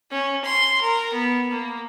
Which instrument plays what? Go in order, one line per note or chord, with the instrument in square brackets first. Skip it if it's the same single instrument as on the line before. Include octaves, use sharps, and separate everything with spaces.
[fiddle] C#4
C6
A#4
B3
A#3